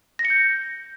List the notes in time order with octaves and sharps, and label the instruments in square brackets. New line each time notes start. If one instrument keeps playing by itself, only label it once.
[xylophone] A#6
C#7
G6